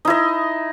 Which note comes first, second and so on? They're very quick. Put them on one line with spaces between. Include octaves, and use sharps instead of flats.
D#4 E4 D#5